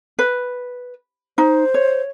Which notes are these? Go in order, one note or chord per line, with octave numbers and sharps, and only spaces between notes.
B4
D#4 C5
C#5